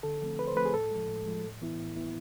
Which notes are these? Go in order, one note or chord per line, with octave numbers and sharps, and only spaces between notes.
D3 A4
F3 A3 C4
D3 B4
C5
F3 A3 C4 B4
G#4
A2 A4
F3 G#3
A2
F3 G#3
A2
E3 B3 E4
A2
E3 B3 E4